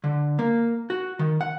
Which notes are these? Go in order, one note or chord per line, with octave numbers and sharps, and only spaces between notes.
D3
A#3
F#4
D#3
F#5